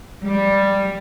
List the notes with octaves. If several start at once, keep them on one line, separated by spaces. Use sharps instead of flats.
G3